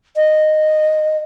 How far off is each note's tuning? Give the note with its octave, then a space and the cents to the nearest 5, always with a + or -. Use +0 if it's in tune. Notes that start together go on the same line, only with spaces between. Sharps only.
D#5 -10